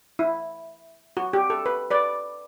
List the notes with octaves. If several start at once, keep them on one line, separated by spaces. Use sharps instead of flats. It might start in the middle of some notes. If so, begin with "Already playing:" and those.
E4
F#4
G4
A4
B4
B4 D5